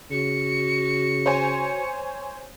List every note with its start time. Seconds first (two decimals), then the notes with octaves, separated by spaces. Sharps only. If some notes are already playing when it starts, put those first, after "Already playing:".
0.11 C#3 F#4 C#7
1.26 C5 C#5 G#5